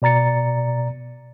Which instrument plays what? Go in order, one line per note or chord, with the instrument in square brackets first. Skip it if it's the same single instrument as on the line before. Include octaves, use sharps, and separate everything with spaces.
[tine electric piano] B2 D5 A#5 A6 C#7